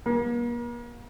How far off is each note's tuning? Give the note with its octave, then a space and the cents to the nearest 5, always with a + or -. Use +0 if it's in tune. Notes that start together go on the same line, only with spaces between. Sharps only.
A#3 +40